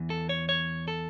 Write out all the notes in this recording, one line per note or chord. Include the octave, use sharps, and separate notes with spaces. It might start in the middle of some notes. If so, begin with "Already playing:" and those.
Already playing: E2 E3
A4
C#5
C#5
A4